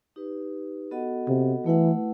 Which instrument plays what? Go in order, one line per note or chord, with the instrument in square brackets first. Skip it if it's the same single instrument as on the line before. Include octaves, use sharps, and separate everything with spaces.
[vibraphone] D#4 G4 B4
B3 F#4 A4 D#5 F#5
[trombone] C3
[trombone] E3 [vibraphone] A3 E4 B4 F#5